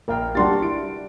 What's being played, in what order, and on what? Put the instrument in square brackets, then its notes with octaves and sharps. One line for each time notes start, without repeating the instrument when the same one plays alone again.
[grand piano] A#1 G5 [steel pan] A#4 F5
[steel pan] G3 D4 G4 [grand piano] F#4 C6 A6
[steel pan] E4 [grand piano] D7